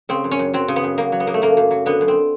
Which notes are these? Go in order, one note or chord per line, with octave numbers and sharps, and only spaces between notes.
C#3 C4
F#2
C#4
F#2
F#3 C4
C#3
B3
F#2
F#2 A#3
F#3
B3
C#3 A#3
A3
F#2 A#3
F#2
F#3
D3 B3
F#2
C4